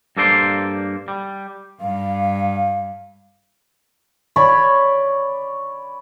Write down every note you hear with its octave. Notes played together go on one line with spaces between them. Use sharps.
G2 A#3 A4 C5 D5 C6
G3
G2 F5
C#5 D5 B5 C#6